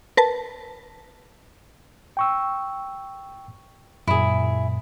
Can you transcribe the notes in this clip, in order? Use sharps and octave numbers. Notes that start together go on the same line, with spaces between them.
A#4 B4 A5
G5 C#6 E6
F#2 A#2 E4 G#4